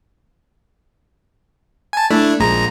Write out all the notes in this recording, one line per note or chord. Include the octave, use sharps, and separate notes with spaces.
G#5 A5
A3 D4 E4
A#1 G#3 A#5